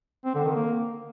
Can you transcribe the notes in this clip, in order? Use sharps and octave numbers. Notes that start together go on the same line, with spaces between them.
C4
D3
D#3
A#3